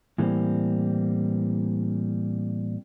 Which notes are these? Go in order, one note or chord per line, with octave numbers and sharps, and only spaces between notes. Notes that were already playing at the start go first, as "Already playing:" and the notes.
A2 E3 G3 A#3 C4